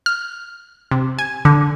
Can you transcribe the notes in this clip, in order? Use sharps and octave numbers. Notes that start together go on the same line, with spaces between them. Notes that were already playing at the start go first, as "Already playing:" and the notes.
F6
C3
G#5
D3